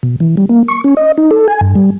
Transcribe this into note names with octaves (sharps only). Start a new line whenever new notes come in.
B2
E3
G3
A#3
C#6
C#4
D#5
D#4
A4
G#5
G2
G3